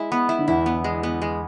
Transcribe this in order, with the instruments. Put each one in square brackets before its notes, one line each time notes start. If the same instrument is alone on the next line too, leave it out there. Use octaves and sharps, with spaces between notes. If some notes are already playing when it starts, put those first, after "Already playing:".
Already playing: [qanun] G#3 E4
B3
E4
[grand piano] D3
[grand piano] E2 E3 [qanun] E4
[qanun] B3
G#3
B3
G#3